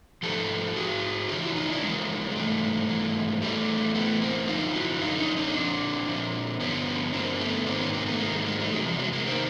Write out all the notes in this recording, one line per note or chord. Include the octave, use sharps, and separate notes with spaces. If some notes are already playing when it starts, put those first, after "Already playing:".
G#2 F3 G4 A4
G#2 F3 F#4 G#4
F2 C#3 E3 F4 G4
E4 F#4
D#4 F4
D4 E4
F2 C#3 E3 G#3 A#3
G#3
G#2 E3 G3 A3
G#2 E3
A2 E3 G3 A3
A2 E3 A3 B3
A#3 C4
F#2 D3 F3 D#4 F4
E4 F#4
F#2 D3 F3 D#4 F4
C#4 D#4
C#4 D#4
A#2 F3 C4 D4
A#2 F3
G2 D3 F3 B3 C#4
G2 D3 F3 A#3 C4
A3 B3
G#2 D#3 A#3 C4
B3 C#4
A#3 C4
A3 B3
G#2 D#3 G#3 A#3
G3 A3
G#3 A#3
G3 A3
E2 C3 D#3 F#3 G#3
F3 G3
F#3 G#3
G#3 A#3
C3 D#3 A#3 C4